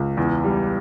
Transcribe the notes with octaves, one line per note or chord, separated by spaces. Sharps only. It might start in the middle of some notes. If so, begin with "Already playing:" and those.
Already playing: C#2
E2
G3